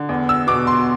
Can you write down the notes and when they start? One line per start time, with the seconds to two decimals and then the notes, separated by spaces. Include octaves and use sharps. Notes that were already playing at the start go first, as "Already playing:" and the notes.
Already playing: D3
0.09 E2
0.29 E6
0.47 B2 D6
0.67 C6